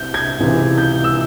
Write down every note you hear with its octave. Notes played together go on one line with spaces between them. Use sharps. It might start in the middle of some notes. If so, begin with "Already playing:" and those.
Already playing: C2 C3 G6
G#6
C#2 C3 E3 G#3
G6
E6